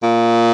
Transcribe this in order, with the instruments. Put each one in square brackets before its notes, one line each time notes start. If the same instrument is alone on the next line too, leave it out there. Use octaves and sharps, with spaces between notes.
[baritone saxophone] A#2